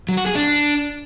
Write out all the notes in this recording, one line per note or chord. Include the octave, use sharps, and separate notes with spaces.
F#3
F#4
G#4
D4